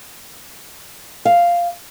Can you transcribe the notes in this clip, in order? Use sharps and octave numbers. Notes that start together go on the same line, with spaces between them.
F5